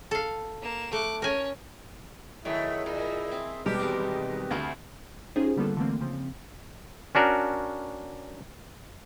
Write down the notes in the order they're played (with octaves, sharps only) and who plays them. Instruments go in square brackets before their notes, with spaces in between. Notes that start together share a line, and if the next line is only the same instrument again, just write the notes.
[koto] A4 F5
[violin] A#3 E7
[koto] A3 [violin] D6 F#6
[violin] C#4 C#5 [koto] A#4 G#5
[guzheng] D#3 [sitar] F#3 A3 [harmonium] E4 G#4 E5
[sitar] A#2 [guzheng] D#4
[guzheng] C4
[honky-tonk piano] B2 G3 G#3 [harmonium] D#3 B4 D#5 [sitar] G4 [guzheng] A#4
[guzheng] E2 C4 A#4
[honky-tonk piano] D2 [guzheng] A3 F4 A4
[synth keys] C#4 D#4 F4 G4 G#4 C5
D3 G3 A#3 B3 F4 A4
D3 E3 A3 A#3 C4
C#3 F3 C4
[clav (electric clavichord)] C#4 D4 F#4 A#4